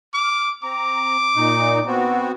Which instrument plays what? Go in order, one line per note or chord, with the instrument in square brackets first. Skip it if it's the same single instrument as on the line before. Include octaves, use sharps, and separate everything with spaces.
[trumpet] D6 [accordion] F6
[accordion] C4 A#5 [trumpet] D6
[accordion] A#2 D#4
B3 C4 F#4